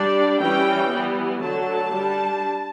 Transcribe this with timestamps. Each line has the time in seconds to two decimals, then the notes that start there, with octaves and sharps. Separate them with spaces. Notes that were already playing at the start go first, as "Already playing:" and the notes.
Already playing: G3 D4 D5
0.39 E3 G3 C#4 G5
0.91 E3 G3 B3
1.41 D3 F#3 A3 A5
1.93 G3 D4